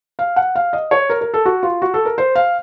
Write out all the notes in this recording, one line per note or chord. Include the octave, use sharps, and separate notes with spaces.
F5
F#5
F5
D#5
C#5
A#4
A#4
A4
F#4
F4
F#4
A4
A#4
C5
F5